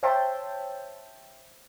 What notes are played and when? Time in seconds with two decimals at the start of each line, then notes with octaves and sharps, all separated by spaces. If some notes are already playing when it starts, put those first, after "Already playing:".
0.03 C5 C#5 E5 G5 A5 C6